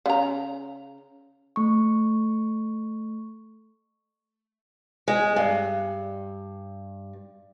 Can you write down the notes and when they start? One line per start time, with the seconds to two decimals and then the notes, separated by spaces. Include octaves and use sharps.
0.06 C#3 A#5
1.56 A3 C#6
5.08 G#3
5.36 G2